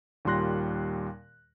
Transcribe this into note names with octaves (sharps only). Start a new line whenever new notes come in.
D#2 A#2 G3 C6 F#6 A#6